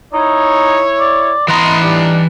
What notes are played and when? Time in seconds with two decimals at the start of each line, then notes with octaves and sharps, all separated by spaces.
0.14 D#4 E4 C#5
1.00 D5
1.48 E3 B3 D#5 A#5 C6
1.81 G3 D4 D#4